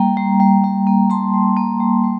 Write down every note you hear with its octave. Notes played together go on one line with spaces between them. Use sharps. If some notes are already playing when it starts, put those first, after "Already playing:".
Already playing: G3 A#3 G5 A#5
G3
G3
G3
A#3
G3 A5 C6
G3
A#3
G3
G3